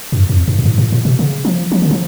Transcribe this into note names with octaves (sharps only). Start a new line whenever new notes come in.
F#2
F2
F#2
F#2
G#2
A2
A2
B2
C#3
F3
F3
D3
F3